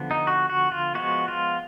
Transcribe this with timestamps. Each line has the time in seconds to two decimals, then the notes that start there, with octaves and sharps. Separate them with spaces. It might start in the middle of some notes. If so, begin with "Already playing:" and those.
Already playing: D3 F3 B3
0.11 D#4
0.27 F#4
0.50 F#4
0.72 F4
0.95 F3 G#3 B3 F#4
1.28 F4